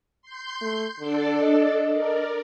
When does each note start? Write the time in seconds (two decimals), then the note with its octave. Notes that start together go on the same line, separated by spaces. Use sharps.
0.22 C6 G6
0.61 A3
0.99 D3 D4 A4 D5
1.42 D#5
1.92 A#4 D5